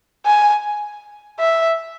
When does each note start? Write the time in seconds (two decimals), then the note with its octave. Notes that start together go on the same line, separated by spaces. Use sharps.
0.26 G#5
1.39 E5